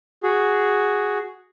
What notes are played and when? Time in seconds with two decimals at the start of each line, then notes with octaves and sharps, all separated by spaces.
0.23 F#4 G#4